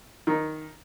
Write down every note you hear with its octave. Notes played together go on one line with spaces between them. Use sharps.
D#3